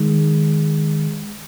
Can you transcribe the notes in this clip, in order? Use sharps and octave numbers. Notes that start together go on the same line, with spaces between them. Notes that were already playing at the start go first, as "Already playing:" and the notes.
Already playing: D#3 G#3